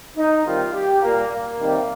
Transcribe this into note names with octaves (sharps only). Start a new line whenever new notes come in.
D#4
C3 D#3 G3 F4
G4
A#2 G3 A#3
A#3
C3 D#3 G3